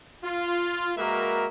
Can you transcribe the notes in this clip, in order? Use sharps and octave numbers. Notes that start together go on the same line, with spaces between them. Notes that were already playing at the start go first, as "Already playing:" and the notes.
F4
G#3 A#3 F#4 A#4 B4 E5